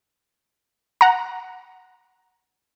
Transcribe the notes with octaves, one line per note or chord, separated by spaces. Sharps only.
F#5 A#5